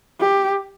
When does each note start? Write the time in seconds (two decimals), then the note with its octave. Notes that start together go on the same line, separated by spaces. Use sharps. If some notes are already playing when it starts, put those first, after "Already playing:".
0.21 G4